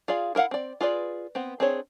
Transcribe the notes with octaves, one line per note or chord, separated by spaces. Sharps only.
F4 G#4 D5 F5
E4 A#4 C5 F5 F#5
C4 D5
F4 G#4 B4 D5
B3 C4
C4 D4 G#4 C5 C#5